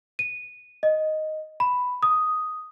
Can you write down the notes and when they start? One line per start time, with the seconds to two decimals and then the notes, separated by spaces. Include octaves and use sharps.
0.19 D#7
0.83 D#5
1.60 B5
2.03 D#6